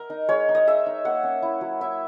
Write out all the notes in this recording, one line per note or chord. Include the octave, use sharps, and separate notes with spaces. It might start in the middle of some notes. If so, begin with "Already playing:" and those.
Already playing: A#4
D#4
G#3 C#5
D#4
D#5
G#3 E5
D#4
A#3 F#5
C#4
E4
F#3
E4 E5